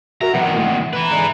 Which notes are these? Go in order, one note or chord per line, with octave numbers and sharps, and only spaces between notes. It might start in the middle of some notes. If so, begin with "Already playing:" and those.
F#4 A#4 E5 A#5
C3 D#3 E3 F#3 B3 F#5
E3 A3 A#3
E4 B4 A#5
G#2 D3 G#3